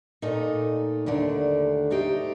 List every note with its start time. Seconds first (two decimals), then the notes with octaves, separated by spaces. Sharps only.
0.22 A#2 A3 D#4
1.06 D#2 D3 A3 D4
1.90 A3 D#4 G4 C5